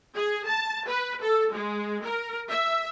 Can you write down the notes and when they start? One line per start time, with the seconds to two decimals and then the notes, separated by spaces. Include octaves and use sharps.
0.16 G#4
0.48 A5
0.88 B4
1.21 A4
1.54 G#3
2.05 A#4
2.50 E5